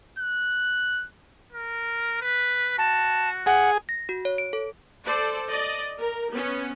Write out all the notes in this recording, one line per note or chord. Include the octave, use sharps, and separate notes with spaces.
F#6
A#4
B4
F#4 A5
G#4 F#5
A#6
F#4
C#5
D7
A4
A4 C5 D5
D5 D#5
A#4
B3 C#4